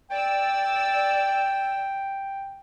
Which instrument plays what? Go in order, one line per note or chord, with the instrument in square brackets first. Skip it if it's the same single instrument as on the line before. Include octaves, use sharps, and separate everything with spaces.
[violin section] D5 E6 [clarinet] G5